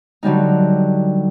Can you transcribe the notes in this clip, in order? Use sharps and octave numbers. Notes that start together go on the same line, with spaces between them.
D3 F#3 G3 D#4